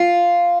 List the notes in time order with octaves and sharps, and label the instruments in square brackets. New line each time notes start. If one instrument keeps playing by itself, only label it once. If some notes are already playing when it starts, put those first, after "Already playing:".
Already playing: [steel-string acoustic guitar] F4